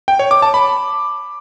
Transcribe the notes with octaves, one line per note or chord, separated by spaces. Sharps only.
G5
C#5
D6
A5
B5